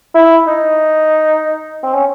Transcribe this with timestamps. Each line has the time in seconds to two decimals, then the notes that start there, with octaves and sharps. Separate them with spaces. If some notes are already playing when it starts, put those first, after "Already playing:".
0.15 E4
0.47 D#4
1.84 C4
1.93 C#4